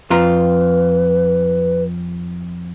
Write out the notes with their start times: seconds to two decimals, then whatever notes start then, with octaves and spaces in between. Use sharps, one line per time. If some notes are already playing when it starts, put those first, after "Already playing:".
0.10 F2 F4 B4 A#5